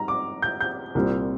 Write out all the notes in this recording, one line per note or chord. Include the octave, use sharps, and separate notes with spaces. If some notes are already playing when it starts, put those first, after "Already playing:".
Already playing: G#2 G3 A#5
D6
G6
G6
C2 A#2 G3 C4